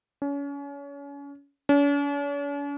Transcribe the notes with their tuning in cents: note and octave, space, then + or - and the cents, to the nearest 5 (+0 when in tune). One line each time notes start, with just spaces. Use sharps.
C#4 +30
C#4 +45